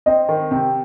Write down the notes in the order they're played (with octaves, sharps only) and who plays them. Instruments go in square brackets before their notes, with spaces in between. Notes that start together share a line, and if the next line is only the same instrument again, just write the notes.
[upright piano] C4 [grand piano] D#5
[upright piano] D#3
[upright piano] C3 [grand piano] G5